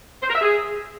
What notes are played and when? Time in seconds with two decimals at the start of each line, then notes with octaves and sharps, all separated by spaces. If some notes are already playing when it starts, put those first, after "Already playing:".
0.22 C5
0.29 A#4
0.35 E5
0.42 G#4